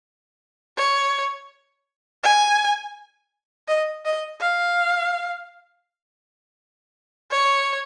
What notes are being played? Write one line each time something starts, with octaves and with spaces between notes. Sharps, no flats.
C#5
G#5
D#5
D#5
F5
C#5